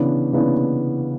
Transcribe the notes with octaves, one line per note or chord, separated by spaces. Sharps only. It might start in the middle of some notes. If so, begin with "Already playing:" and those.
Already playing: C#3 E3 B3 D4
C#3 E3 B3 D4